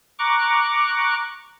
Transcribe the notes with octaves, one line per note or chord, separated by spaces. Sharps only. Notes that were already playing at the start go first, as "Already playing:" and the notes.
A#5 C#6 D6 F#6